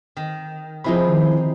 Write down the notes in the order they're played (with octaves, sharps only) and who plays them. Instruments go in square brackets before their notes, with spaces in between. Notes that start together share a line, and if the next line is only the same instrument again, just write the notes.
[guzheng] D#3
[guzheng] C3 G#3 D#4 [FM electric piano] F3 E4 B5
[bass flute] D#3